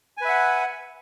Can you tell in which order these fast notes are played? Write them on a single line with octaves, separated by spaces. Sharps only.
G#5 B4 E5 F#5